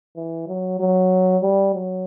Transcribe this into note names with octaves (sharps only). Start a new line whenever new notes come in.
E3
F#3
F#3
G3
F#3